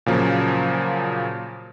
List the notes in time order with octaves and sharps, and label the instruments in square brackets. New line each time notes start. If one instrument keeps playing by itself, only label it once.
[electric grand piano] A#2 C#3 F3 F#3 A#3